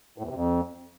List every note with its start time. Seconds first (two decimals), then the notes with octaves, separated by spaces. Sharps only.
0.18 A2
0.23 E2
0.29 C3
0.34 F2